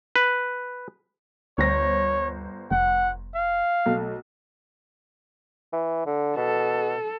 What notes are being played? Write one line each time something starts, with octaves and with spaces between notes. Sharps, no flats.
B4
G1 D2 C5 C#5 A#6
F1 F#5
F5
B1 A3
E3
D3
B2 A4